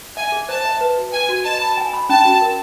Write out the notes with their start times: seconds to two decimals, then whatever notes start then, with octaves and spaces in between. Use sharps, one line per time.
0.16 E5 G#5
0.32 G#4
0.49 C5 A5
0.65 E5
0.81 B4
0.97 F#4
1.12 B4 G#5
1.29 F#4
1.44 D#5 A5
1.61 B5
1.77 G#5
1.93 B5
2.09 C#4 A5
2.25 F#4
2.41 A#4